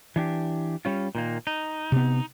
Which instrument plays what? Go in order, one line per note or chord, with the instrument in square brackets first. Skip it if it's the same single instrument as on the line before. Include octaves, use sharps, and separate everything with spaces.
[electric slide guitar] E3 D4 G4
G3 C#4 F4
A#2 D#3 A#3
D#4
[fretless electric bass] C3 B3